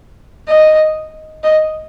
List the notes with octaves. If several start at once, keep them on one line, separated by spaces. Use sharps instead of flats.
D#5
D#5